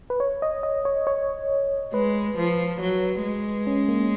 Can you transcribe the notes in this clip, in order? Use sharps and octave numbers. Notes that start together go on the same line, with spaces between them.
B4
C#5
D#5
D#5
C#5
C#5
G#3 B4
F3
F#3
G#3
C#4
A#3